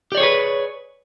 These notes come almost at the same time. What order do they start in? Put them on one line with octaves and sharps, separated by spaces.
G4 D5 C#5 G#4 B4